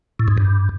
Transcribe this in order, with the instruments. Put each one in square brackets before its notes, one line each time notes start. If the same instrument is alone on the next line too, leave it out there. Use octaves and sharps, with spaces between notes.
[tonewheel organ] A2
G#2
G2